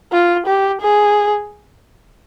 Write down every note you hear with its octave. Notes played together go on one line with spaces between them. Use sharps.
F4
G4
G#4